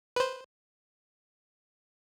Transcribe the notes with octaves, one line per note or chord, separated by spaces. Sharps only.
B4 C5